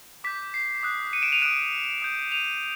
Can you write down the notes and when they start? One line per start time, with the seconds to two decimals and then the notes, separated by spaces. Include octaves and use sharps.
0.24 D6 G6 B6
0.54 C7
0.83 D#6 F#6
1.13 C#7 D#7
1.22 D7 E7
1.32 D#7 F7
1.42 D#6 F#6 D7 E7
2.02 D#6 G6
2.32 D#7 F7